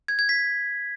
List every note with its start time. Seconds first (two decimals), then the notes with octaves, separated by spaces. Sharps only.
0.08 G#6
0.19 G#6
0.29 B6